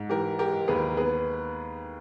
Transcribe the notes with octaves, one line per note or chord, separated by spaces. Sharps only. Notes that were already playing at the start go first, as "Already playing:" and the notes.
Already playing: G#2
E3 G4 A#4
G#3 G4 A#4
D#2 G#4 B4
B3 G#4 B4